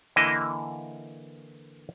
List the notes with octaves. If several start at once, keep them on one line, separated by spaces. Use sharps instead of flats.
D3 E3 A#3 E4 D#5